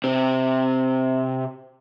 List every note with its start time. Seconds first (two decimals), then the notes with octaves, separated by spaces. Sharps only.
0.04 C3 C4